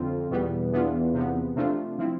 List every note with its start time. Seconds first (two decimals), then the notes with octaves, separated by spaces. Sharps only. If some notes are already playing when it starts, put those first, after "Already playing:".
Already playing: F2 D3 F3 C4 F4
0.31 E2 B2 G3 B3
0.73 E3 B3 D4 F4
1.14 C3 F3 B3
1.56 C3 F3 A3 D4 F4
1.98 F3 C4 E4